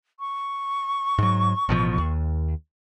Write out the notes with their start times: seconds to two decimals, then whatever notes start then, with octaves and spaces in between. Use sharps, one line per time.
0.19 C#6
1.18 G#2 F#3
1.69 A1 B2 F3
1.98 D#2